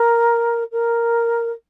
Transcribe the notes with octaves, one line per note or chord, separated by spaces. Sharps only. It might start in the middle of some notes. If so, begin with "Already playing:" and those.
Already playing: A#4
A#4